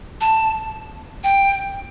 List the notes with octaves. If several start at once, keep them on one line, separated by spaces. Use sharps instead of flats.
A5
G5